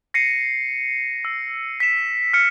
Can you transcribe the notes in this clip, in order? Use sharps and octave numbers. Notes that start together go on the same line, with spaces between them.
A#6 C7 C#7 D#7
E6
B6 E7
F6 C#7